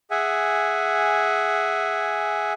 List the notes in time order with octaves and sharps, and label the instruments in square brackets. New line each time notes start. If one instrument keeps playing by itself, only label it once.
[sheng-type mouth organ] G#4 E5 F#5 G#5